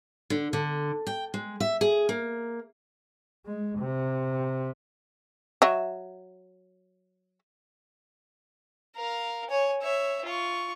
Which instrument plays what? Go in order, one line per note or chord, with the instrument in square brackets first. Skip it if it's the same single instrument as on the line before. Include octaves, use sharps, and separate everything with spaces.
[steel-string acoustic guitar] D3
D3
G5
G#3
E5
G#4
A#3
[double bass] G#3
C3
[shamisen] F#3 D#5 E5
[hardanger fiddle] A#4 F5
C#5 G#5
C#5 E5
F4 C#6